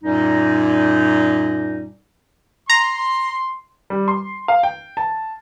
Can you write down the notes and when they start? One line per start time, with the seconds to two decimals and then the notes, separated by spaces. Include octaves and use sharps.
0.04 F#2 A#2 G3 D#4
2.70 A#5 C6
3.90 G3
4.08 C6
4.48 F5
4.63 G5
4.97 A5